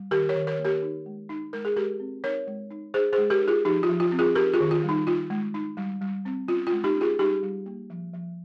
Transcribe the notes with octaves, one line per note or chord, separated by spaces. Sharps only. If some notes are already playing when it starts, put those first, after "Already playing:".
Already playing: G3
D#3 G4 A#4
A#4 C#5
D#3
A#4 C#5
A#3
G4 A#4
D#4
G#3
D#4
G#3 A#4
G#4
G#3 G4 A#4
C4
D#4 A#4 C#5
G#3
D#4
D#4 G#4 C5
G#4 C5
G#3
G4 A#4
D#4
F4 G#4
F3 D#4 G4
F4
F3
F4
C4
F4 G#4
D#4 G4 A#4
F4 G#4
D#3
F4
G3
D#4
D#4 F4
G#3
D#4
G3
G3
C4
C#4 F4
F4
G#3
D#4 G4
C#4
F4 G#4
G3 D#4 G4
G3
A#3
F3
F3